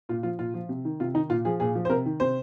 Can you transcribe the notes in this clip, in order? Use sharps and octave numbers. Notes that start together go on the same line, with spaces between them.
A#2 F4
F3 F4
A#2 F4
F3
C3
D#3
C3 F4
D#3 D#4
A#2 F4
F3 G#4
A#2 G#4
F3
C5
C3 A#4
D#3
C3 C5